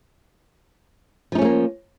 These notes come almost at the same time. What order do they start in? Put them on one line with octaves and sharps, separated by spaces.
F3 D#4 C#4 A3 A#3